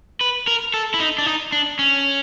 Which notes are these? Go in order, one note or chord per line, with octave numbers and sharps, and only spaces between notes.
B4
A#4
A4
E4
D#4
D4
D#4
D4
C#4